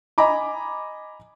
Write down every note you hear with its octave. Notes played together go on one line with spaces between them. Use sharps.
D#5 G#5 A#5 B5 D6